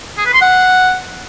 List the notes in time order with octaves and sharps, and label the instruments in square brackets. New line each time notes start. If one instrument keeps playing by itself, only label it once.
[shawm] G#4
B4
C6
F#5